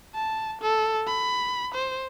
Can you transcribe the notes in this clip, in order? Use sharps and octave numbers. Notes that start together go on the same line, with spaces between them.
A5
A4
B5
C5